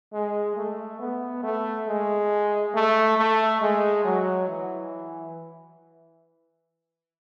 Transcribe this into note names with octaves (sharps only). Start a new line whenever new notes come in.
G#3
A3
B3
A3
G#3
A3
A3
G#3
F#3
E3